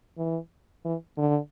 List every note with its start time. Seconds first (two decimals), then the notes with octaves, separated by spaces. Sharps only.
0.17 E3
0.85 E3
1.18 D3